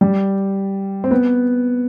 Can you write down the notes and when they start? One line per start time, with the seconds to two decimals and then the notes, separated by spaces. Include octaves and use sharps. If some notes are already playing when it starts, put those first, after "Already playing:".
0.01 G3
1.04 C4
1.11 B3